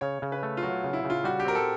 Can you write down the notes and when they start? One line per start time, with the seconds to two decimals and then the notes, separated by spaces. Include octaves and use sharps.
0.01 C#3 C#5
0.22 C#3
0.32 B4
0.43 A3
0.57 F4
0.62 F#3 F#4
0.84 C#3
0.93 E4
1.04 C#3
1.10 F4
1.24 G3 F#4
1.40 G4
1.45 C4 A#4
1.55 A4